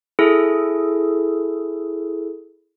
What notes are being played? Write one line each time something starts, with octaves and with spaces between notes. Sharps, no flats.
E4 G#4 A4